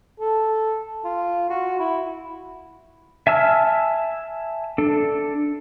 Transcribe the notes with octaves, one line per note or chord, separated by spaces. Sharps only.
A4
F4
F#4
E4
E5 G#5 A5 E6 F6
D4 A4